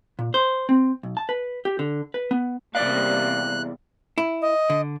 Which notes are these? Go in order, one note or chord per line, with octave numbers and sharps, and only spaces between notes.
A#2
C5
C4
B1
A5
B4
G4
D3
B4
B3
E2 C3 G3 A#3 D5 F5 F#6
E4
D#5
D3